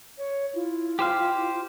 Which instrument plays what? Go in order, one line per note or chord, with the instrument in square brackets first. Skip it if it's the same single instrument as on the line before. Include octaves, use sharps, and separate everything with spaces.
[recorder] C#5
[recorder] E4 [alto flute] F4
[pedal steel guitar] G4 C5 F5